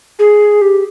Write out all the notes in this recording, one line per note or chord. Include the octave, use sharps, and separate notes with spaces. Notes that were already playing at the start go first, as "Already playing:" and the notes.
G#4
G4